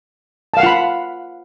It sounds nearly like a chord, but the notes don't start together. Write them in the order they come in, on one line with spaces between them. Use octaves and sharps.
A5 F5 F#5 F4 B5